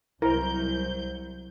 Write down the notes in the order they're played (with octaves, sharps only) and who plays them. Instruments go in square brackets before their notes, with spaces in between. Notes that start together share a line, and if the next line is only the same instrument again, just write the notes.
[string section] C2 F#3 G6 [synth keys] E4 C5 [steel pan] A#4